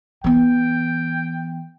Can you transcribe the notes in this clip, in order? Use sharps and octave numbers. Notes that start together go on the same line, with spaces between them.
E3 B3 G5